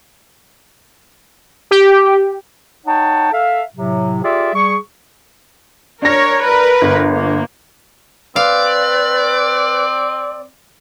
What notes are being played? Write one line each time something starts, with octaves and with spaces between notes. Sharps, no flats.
G4
D#4 C#5 F#5 G5 A5
A4 E5 F5
A2 C3 F#3
F4 G4 G#4 D5 E5
G3 G#4 C#6
D4 A#4 C#5 A#6
A#4 B4
G1
A#3
C4 B4 D5 F5